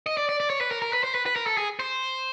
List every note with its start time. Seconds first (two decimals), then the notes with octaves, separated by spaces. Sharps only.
0.06 D#5
0.17 D5
0.29 D5
0.40 D5
0.50 C#5
0.61 B4
0.71 A#4
0.82 A#4
0.93 B4
1.04 C5
1.15 B4
1.26 B4
1.36 A#4
1.47 A4
1.57 G#4
1.79 C5